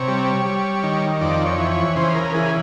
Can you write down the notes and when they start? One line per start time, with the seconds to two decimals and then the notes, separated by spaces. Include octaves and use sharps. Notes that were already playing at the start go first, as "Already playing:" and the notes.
Already playing: C3 C#5
0.08 G3
0.45 G3
0.83 D#3
1.21 F2 D5
1.46 C#5
1.58 E3
1.71 C#5
1.96 C#3 C5
2.15 A#4
2.34 E3 G#4